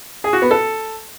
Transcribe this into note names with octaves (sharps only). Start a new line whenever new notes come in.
G#4
F#4
B3
A4